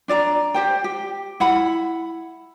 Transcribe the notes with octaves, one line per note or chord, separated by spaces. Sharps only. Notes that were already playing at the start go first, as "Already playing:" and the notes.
D4 D5 D#5 A#5
G4 C5 G5
G4
E4 F#5 B5